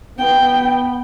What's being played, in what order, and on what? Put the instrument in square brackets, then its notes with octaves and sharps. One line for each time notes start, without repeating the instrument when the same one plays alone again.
[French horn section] B3 [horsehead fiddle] G5